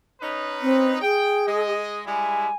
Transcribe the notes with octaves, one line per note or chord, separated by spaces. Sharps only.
C#4 D#4 B4
C4
G#4 G5
G#3 D#5
G3 G#3 E4 G#5